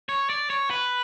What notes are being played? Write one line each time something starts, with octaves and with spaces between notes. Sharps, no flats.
C#5
D5
C#5
B4